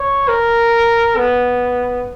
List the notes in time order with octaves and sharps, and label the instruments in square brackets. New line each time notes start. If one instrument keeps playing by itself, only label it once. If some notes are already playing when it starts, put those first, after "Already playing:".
Already playing: [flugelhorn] C#5
A#4
B3